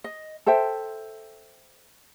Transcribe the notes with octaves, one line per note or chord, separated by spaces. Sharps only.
D#5
A4 C5 E5 G5